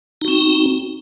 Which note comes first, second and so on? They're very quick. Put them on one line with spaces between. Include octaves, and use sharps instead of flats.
D#4 F#4 C4